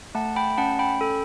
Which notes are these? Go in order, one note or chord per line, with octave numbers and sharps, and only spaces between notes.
A3 F#5 A5
G5 B5
C#4 F#5 A5
G5 B5
A4